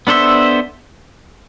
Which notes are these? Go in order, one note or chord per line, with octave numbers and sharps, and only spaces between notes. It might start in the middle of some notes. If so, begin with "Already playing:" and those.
B3 D4 A4 C5 E5